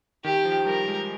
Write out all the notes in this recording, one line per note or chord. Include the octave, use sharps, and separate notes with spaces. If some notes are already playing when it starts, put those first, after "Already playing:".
D#3 G4
F3
G3 A#4
G#3